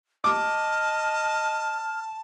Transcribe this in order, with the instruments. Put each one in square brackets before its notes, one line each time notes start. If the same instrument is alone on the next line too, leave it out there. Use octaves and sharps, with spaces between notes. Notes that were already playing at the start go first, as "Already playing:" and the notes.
[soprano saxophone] D#5 [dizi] A5 [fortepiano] D6 [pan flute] F6